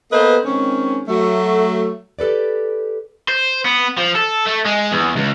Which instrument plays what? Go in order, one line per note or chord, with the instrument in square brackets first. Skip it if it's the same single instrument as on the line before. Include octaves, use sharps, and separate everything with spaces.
[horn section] A#3 B3 A4 B4 C5 D#5
D#3 G#3 C4 C#4
F#3 A3
[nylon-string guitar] G4 A4 B4 D5
[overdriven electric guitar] C5
B3
F3
A4
A3
G#3
E2
C#2